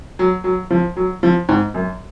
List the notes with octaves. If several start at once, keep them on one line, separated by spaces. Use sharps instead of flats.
F#3
F#3
F3
F#3
F3
G#2
F#2